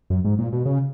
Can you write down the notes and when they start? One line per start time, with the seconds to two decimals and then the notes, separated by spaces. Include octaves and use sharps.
0.10 F#2
0.25 G#2
0.39 A#2
0.53 B2
0.65 C#3